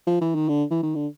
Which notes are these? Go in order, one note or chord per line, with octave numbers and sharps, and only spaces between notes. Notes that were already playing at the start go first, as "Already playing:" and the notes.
F3
E3
D#3
D3
E3
D#3
D3